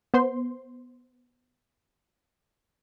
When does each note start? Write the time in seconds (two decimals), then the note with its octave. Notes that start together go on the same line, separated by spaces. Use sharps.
0.14 B3 C5 C6